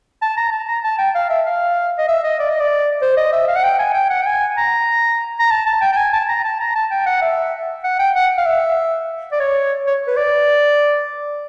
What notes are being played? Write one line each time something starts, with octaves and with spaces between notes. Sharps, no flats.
A5
A#5
A5
A#5
A5
G5
F5
E5
F5
D#5
E5
D#5
D5
D#5
D5
C5
D#5
E5
F5
F#5
G5
G#5
G5
F#5
G5
G#5
A#5
A#5
A5
A5
G5
G5
G#5
A5
A#5
A5
A#5
A5
G5
F#5
E5
F#5
G5
F#5
F5
E5
D5
C#5
C#5
B4
D5